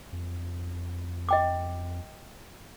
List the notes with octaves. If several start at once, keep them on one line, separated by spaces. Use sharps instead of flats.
F2
D#5 G5 D6